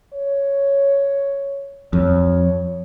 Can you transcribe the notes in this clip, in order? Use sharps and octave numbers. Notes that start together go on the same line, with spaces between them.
C#5
F2 C#5